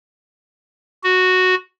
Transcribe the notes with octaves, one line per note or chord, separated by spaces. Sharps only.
F#4